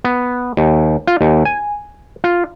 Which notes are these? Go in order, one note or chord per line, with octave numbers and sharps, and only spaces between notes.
B3
D#2
F4
D#2
G#5
F4